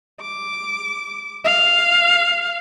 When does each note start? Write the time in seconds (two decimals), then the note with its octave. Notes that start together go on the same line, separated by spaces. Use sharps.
0.21 D6
1.45 F5